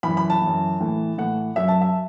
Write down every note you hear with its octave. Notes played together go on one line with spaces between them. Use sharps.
F#2 E3 B5
B5
A5
E3
F#2
A2 E3
A2 E3 F#5
F#2 F#3 E5
A5
E5